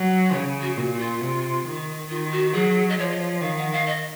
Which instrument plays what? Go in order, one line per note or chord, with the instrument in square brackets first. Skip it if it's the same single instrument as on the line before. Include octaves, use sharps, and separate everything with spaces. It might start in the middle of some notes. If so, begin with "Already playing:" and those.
Already playing: [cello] F#3
[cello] C#3 [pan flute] C#5
[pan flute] F#4
[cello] A#2 [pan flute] F#4
[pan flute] F#4
F4
[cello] C3
D#3
[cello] D#3 [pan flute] F4
[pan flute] F#4
[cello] F#3 [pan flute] G#4
[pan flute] D#5
[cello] F3 [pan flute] C#5
[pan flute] D#5
C#5
[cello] D#3 [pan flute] F5
[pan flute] F#5
F5
D#5